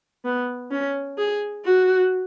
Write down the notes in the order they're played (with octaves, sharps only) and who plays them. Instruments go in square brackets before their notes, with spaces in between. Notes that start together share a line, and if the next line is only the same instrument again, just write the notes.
[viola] B3
C#4
G#4
F#4